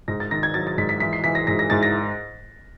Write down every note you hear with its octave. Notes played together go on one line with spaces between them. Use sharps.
G#2 A#6
A6
D#3 A#6
G#6
F#3 A6
A6
G#2 B6
B6
E3 B6
C7
E3 B6
A#6
G#2 A#6
A#6
G#2 A6
A#6